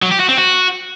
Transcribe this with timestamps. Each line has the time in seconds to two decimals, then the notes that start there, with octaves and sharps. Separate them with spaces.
0.02 F#3
0.11 G4
0.20 F#4
0.29 C4
0.37 F#4